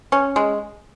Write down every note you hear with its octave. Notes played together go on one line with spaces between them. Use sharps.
C#4
G#3